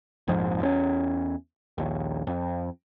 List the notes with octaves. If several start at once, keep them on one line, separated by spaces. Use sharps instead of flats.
A#1 F2 G#2 F3
E2 C4 C#4
A#1 D#2
F2